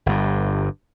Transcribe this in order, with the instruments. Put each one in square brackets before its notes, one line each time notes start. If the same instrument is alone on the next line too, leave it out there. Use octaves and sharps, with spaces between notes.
[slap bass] G1 G2